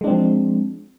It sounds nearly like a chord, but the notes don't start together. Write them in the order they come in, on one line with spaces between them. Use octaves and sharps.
G#3 D4 C4 F3